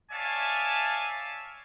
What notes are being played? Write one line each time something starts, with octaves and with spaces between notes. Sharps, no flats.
C#5 D5 E5 F5 G#5 A5